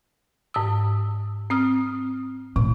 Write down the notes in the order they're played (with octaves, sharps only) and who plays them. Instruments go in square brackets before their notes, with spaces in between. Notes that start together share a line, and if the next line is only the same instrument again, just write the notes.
[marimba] G#2 D#6 E6
C4 D#6 F6
[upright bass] A2 [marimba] C3